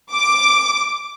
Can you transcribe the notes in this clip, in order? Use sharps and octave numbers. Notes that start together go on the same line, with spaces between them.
D6